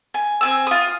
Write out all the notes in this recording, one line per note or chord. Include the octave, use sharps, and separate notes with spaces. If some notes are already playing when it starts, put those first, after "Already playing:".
G#5
C4 G#5 E6
F4 D#6